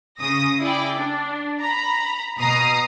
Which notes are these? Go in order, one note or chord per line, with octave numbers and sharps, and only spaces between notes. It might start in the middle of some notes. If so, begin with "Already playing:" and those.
C#3 D#6 A#6
E4 G#4 D5 G5
D4
A#5 B5
B2 A#5 D#6 C7